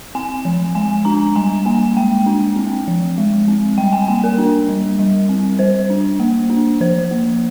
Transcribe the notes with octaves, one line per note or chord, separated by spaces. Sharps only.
C4 G#5
F3
G#3 G#5
D4 A#5
G3 G#5
A#3 G#5
G#3 G5
D4
C4
F3
G#3
C4
G3 G5
G#5
A#3 G#5
A#4
D4
G3
G3
C4
G3 C5
D4
A#3
D4
F3 C5
A#3